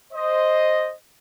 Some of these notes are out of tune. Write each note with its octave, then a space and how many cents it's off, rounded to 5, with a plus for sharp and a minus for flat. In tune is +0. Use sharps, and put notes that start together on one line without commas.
C5 +0 D#5 +0